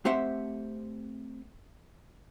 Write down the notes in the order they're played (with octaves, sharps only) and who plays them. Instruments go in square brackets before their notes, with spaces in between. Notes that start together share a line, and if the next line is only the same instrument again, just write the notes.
[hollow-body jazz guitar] A3 C4 G4 C5 E5 F#5